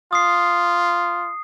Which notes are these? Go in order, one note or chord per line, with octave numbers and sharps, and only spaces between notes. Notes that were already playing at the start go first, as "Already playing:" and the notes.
F4 D#6 C7